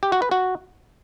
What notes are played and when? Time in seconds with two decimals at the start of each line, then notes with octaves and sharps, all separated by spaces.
0.03 G4
0.12 F#4
0.22 B4
0.31 F#4